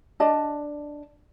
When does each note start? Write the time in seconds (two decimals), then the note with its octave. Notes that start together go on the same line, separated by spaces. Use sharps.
0.20 D4 D5 D#5 A5